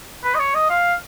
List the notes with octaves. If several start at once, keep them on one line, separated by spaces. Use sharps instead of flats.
B4
D#5
C#5
D#5
F5